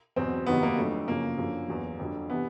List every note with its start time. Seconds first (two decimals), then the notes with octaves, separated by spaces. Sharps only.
0.16 E2 B2 F#3 C4
0.46 F2 C3 D#3 F#3 B3
0.63 A#3
0.77 F2 D3 F#3 A3
1.08 F#2 C#3 F3 A#3
1.38 F#2 D3 F3
1.68 E2 B2 F#3
1.99 F2 D3 F#3
2.30 C3 E3 B3